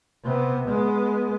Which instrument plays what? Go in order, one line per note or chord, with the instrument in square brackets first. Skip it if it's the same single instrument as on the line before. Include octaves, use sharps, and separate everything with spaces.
[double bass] C3 B3
G#3 B3